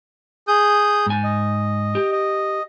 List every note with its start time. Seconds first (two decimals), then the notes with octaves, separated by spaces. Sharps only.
0.48 G#4 D#6 G6
1.06 G#2 G#5
1.24 D#5
1.95 G4
2.12 D#5